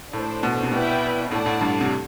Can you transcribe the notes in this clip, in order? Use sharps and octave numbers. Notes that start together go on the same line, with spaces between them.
A2 D4 A4 C5
B2
C3
B2 E4 B4 D5 G5
A2 D4 A4 D5 F#5 A5
A2
G2
C3